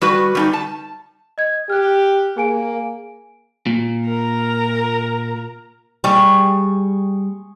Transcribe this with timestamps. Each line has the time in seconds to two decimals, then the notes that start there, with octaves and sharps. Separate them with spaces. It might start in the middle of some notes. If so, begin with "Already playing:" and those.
0.02 G3 F#4 B4
0.35 G3 C#4 D#4
0.53 A5
1.38 D#5 G#6
1.70 G4 F6 F#6
2.37 A#3 G#4 G#5 D7
3.66 A#2
4.07 A#4 A#5
6.04 G3 G4 G#4 C#6